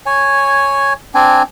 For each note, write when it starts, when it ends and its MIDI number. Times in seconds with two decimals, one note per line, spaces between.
0.06 0.93 73
0.06 0.93 80
1.14 1.43 60
1.14 1.43 62
1.14 1.43 80